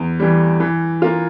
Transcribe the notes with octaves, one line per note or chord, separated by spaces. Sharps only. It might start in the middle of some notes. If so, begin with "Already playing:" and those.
Already playing: E2
E3 G3
E3
A#3 F4